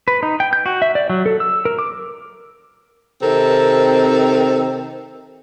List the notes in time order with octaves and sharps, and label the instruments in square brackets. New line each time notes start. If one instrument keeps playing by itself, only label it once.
[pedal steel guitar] B4
D#4
G5
G6
F#4
E5
D5
F#3
A4
E6
A#4
D6
[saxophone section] C3 D#3 C4 A4 A#4